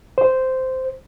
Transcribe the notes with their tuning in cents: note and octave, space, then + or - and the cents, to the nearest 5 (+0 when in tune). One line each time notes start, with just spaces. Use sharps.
C5 -10